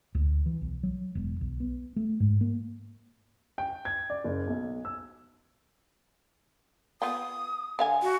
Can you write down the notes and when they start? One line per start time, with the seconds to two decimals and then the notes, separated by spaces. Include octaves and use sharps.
0.15 D2
0.46 E3
0.61 B1
0.83 F#3
1.15 E1
1.41 B1
1.60 B3
1.96 A3
2.20 G#2
2.41 A#3
3.58 G5
3.85 G#6
4.10 D5
4.24 F#1
4.47 B1
4.85 E6
7.02 B3 F4 G5 D#6
7.79 D3 F5 G#5
8.03 F#4